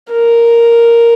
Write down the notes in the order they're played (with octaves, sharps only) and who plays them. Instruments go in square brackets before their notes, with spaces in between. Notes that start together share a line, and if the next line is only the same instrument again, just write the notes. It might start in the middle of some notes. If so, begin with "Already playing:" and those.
[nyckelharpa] A#4